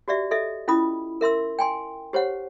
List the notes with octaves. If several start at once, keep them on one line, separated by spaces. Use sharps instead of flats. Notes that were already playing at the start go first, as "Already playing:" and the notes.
F#4 G4 D5 E5
A4 D#5 E5
C#4 E4 F4 B5 D#6
A#4 E5 C6 E6
G5 G#5 C6
G4 C5 C#5 F#5